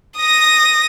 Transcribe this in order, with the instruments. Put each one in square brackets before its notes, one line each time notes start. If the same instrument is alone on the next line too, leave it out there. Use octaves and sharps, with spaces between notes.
[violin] D#6 A#6